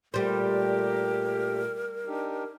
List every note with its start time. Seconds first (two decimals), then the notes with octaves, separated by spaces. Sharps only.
0.14 A#2 G3 A3 G4 A#4 C5
2.07 D4 D#4 G4